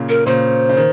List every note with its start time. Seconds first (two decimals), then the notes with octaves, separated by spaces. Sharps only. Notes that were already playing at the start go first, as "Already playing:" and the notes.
Already playing: A#2 C#3
0.09 A#4
0.26 A#2 C#3 C5
0.69 C#3
0.77 D#3